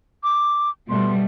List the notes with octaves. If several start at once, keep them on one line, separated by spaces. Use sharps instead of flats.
D6
B2 G3 A3 C6